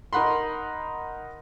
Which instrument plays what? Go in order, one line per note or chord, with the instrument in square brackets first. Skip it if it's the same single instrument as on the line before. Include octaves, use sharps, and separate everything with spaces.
[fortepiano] D#4 A#4 F#5 B5 C6